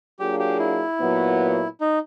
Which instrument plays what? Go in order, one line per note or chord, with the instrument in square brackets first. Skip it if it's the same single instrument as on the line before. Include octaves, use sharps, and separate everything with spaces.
[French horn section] F#3 A#3 D4 F4 G#4 [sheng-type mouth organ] G4
[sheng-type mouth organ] G4
E4
[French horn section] A#2 F#3 B3
[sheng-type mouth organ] D#4